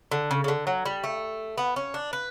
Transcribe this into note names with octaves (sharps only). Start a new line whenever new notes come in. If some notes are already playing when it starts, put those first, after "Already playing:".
D3
C#3
C#3
D3
F#3
G3
A3
B3
C#4
D4
B4